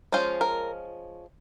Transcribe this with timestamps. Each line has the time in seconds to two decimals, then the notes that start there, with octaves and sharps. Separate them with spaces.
0.12 F3 G#3 C#4 F4 C5
0.41 A#4